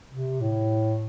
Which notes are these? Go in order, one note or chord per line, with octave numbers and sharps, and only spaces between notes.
C3
A2